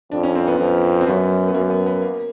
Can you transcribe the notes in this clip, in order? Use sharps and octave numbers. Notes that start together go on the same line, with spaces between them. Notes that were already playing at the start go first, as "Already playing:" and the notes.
F2 D4
C#4
C4
B3
F2
C4
F#2 B3
B3
F#2 A#3
B3
B3
A#3